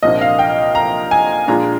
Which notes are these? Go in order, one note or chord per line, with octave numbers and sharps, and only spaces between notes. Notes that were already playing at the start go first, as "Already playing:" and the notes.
C2 A#2 F3 A#3 D4 D#5
F5
G5
A#5
G#5
A#2 G#3 D4 F4 A#5